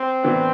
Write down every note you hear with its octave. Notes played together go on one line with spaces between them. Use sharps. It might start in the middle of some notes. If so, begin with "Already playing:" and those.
Already playing: C4
A2 E3 B3 D4